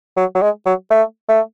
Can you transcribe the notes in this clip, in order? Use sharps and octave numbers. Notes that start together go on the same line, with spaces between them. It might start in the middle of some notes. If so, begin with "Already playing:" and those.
F#3
F#3
G#3
F#3
A3
A3